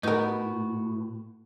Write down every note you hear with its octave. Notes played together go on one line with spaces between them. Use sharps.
A2 B3 D#4 F#4 A#4